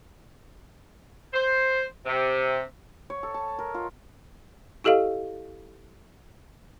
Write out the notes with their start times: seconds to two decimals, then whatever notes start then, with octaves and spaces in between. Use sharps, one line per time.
1.33 C5
2.05 C3
3.10 C#5
3.23 A4
3.34 A5
3.59 A#4
3.74 F4
4.84 E4 G4 A4 D#5 F5